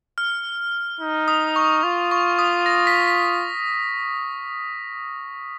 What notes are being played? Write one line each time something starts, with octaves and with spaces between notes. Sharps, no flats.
F6
D#4
D#6
C#6
F4
C#6
D#6
A#6
B6
B6